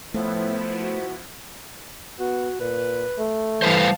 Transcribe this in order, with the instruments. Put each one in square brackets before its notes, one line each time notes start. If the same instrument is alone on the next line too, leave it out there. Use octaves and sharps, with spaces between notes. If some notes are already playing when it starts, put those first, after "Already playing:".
[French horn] A2 [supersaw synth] F3 B3 E4 [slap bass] A3 [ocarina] C5
[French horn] F#4
[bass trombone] B3 [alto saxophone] F#4
[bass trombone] A#2 [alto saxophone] B4
[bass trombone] A3
[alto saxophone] E3 [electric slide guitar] G3 B4 C5 [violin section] F5 A5